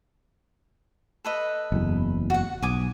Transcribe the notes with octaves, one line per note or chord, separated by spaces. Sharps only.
A4 B4 D#5
F#1 E2
F#4 F#5
B1 G#5 D6 D#6